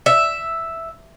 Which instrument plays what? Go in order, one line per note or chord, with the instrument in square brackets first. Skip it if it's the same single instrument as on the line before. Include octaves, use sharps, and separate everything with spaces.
[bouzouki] E5